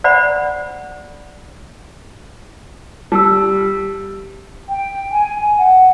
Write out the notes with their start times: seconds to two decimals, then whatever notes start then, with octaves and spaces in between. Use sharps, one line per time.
0.04 C5 D5 F#5 B5
3.12 G3 A5 E6
4.69 G5
5.12 G#5
5.42 G#5
5.57 F#5